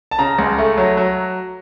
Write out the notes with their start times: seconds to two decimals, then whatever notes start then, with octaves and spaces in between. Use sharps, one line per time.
0.11 A5
0.19 C#3 A#5
0.38 C#2
0.58 A3
0.78 F#3
0.97 F#3